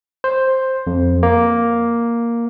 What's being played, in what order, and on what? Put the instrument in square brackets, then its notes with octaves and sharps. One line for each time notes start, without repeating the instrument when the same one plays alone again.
[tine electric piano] C5
F2
A#3